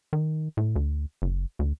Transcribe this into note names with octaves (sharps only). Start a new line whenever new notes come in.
D#3
A2
D2
F#1
D2